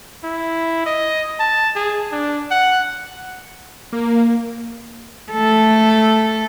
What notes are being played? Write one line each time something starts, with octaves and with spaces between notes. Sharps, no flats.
E4
D#5
A5
G#4
D4
F#5
A#3
A3 A4